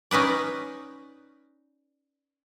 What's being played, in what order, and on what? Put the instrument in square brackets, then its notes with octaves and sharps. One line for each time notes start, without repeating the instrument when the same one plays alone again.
[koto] C#4 D#4 B4 D5